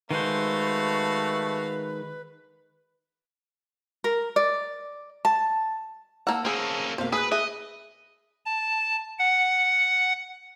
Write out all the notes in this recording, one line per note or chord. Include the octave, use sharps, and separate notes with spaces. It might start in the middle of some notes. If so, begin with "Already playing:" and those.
D#3 G#3 A3 F#4 B4 C5 F5
A#4
D5
A5
A#3 F#5 A5 A#5 E6
A#3 C#4 G#4 C5
B1 A#3 C5 F5
G#4 B4 D#6 F#6
G#4 D#5 E5
A5
F#5